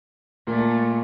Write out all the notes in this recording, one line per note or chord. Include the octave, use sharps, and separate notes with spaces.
A#2 A3